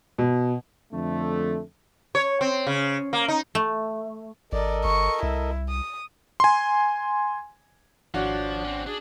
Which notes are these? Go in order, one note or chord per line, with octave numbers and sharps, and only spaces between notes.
B2
F2 D3 A3
C#5
C4
C#3
A#3
D#4
A3
G#1 A4 A#4 D5 D#5
G1 C#6
C2 E4
D#6
G#5 C6
G#1 F3 D4 F#4 C#5 F#5
C4 C#4
D4 G#4